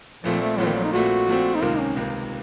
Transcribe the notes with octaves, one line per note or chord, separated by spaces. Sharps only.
A#1 A#2 F3 A3 C4
A3
A#1 A#2 F#3 A3 C4
D#3
F#3
D#4
A#1 A#2 A3 C4 F#4
A#1 A#2 A3 C4
D#4
C#2 C3 D#3 A#3 F4
C#4
C#2 C3 D#3 A#3